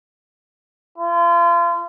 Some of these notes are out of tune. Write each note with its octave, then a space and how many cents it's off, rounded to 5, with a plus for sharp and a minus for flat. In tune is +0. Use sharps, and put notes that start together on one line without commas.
F4 -35